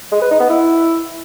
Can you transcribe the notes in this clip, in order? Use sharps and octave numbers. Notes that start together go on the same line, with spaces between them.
G#3
B4
D#4
B3
E4